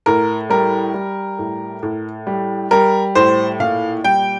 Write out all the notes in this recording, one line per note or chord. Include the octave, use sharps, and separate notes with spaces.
A2 A#4
G3 A#4
G3
A2
A2
G3
G3 A#4
A2 C5
A#2 F5
G3 G5